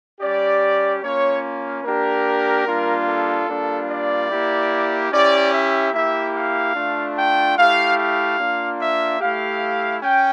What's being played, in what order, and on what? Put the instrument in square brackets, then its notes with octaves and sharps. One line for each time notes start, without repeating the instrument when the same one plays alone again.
[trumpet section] G3 C#4 G4 D5
A#3 C#4 F4 C#5
A#3 D4 G4 A#4
G3 A#3 D4 F4
A4
G3 A#3 D4 F4
D5
A#3 E4 G4
C#4 E4 G4 D5
E5
A#3 E4 G4 E5
F5
A3 D4 F4
G5
A3 E4 G4 F5
F5
A#3 D4 F4
E5
A3 E4 G4 F5
C#4 G5